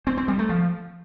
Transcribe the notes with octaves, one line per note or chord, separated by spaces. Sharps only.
C4
C4
G3
A3
F3